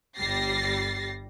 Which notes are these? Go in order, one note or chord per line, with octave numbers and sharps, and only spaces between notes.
G1 G3 A6 A#6 C7